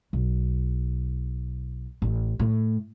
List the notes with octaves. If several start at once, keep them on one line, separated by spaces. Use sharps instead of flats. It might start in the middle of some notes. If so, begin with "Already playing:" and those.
B1
A1
A2